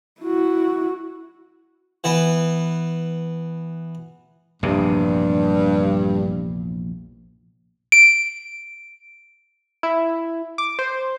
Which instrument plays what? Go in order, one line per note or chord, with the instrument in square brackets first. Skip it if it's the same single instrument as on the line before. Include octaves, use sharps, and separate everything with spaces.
[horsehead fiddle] E4 F#4
[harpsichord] E3 B3 B4
[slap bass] A#1 E2 C3 [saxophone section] G2
[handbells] D7
[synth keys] E4
D6
C5